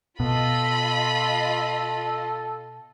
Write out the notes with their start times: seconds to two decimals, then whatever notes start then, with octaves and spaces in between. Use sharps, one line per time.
0.20 B2 F4 A4 D#5 B5